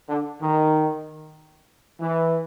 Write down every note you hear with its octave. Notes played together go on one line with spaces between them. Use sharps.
D3
D#3
E3